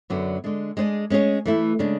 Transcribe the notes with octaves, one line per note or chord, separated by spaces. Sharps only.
F#2 D3 F#3 B3 D4
D3 G#3 D4
G#3 D4 G#4 B4 D5
G#3 C#4 G#4 C#5
E3 A3 E4
C#3 G#3 D4